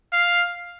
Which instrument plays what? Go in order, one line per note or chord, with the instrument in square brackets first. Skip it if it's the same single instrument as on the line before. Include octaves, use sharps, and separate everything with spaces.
[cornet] F5